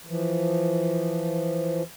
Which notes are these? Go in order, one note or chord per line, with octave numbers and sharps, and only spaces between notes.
E3 F3